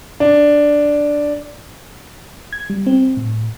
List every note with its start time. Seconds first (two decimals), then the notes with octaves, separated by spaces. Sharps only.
0.20 D4
2.53 G#6
2.70 G3
2.87 C4
3.17 A2